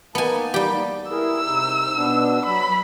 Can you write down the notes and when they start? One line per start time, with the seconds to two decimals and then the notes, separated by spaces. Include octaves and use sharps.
0.15 A#3 B3 D#4 G#5 A5
0.54 G3 G4
1.11 E4 G#4 A#4 E6
1.47 C3 D#4
1.96 B2 B3 D4
2.46 F#3 B5